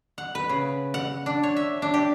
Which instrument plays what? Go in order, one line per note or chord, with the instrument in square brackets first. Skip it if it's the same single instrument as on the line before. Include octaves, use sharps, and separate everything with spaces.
[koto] F#5
B4
C#3
F#5
D4
C#5
E5
D4
G4